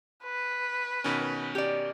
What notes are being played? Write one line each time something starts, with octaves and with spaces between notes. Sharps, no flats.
B4
B2 D#3 C#4
G4 D5